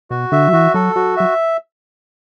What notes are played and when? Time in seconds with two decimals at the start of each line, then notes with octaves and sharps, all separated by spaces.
0.11 B2 F#4
0.32 D3 E5
0.48 F#3
0.53 E3 F#4
0.74 F#3 A4
0.96 F#3 F#4
1.17 F#3 E5